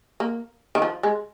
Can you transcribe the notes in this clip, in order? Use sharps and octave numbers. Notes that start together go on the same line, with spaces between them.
A#3
D#3
F3
G#3